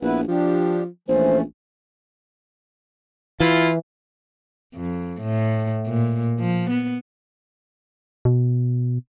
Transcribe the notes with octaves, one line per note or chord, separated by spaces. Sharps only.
A#1 B3 E4 B4
F3 D4 G4
A#1 E3 A3 C#4 C5
E3 E4 F4
F2
A2
A#2
F3
B3
B2